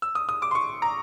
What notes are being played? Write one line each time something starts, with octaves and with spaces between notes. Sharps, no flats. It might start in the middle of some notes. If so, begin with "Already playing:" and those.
E6
D#6
D#6
D6
C6
C#6
A#5